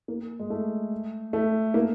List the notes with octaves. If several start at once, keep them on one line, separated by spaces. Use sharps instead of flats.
A#3
G#3
A3
A3
A#3